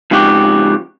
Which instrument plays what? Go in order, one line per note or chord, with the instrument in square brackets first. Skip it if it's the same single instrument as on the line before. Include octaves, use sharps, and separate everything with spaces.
[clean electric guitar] F2 G#2 C#3 F#4 G4